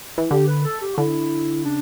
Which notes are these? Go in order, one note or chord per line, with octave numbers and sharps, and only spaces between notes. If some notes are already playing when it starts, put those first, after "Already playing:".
E3
D3 G4
B4
A4
G4
F#4
D3 E4
C#3 D4